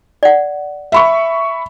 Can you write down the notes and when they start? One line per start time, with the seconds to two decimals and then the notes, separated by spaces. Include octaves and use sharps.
0.23 D5 F#5
0.92 E5 B5 C#6